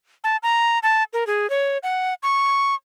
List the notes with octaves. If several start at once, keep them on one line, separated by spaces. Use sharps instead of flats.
A5
A#5
A5
A#4
G#4
C#5
F#5
C#6